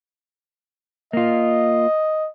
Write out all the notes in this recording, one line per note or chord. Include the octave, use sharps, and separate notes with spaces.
A#3 F4 D#5